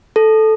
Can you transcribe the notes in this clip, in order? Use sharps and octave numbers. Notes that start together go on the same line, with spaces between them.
A4